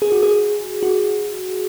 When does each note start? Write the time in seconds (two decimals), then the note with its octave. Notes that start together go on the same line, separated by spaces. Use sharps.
0.02 G#4
0.12 F#4
0.23 G#4
0.83 F#4